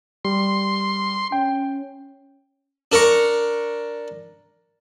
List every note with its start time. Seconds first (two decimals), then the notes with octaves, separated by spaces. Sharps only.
0.25 G3 C6
1.32 C#4 G5
2.92 D4 A#4 A#5 C#6